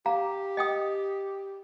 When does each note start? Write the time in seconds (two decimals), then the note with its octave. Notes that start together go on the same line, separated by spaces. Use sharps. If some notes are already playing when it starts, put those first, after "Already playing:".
0.06 G4 F5 A#5
0.57 D#5 G5 D#6